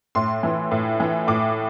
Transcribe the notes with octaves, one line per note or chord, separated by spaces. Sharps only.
A2 C6
E3
A2
E3
A2 D6